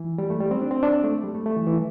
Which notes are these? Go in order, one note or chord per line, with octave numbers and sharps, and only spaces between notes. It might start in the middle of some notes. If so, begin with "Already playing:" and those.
Already playing: E3
G3
A3
G3
C4
D4
C4
D4
A3
G3
A3
A3
E3
E3